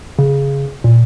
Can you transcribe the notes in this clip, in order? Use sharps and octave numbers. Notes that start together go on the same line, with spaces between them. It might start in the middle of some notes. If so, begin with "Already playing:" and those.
C#3
A#2